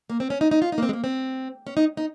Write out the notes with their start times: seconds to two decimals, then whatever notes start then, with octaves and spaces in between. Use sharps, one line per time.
0.10 A#3
0.20 C4
0.30 C#4
0.41 D#4
0.51 D#4
0.62 F4
0.72 D#4
0.78 A#3
0.82 C4
0.89 G#3
0.93 A#3
1.04 C4
1.67 C#4
1.77 D#4
1.97 D#4